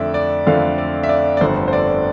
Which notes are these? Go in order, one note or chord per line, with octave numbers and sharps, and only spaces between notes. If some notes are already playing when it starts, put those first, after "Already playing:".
Already playing: F2 D3 A3 D5 E5
D5
F2 D3 A3 F5
D5
E5
D5
D5
G1 F2 D3 A3 C5
C5
D5